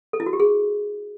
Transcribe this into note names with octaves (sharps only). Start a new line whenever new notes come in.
A4
E4
F#4
G4
G#4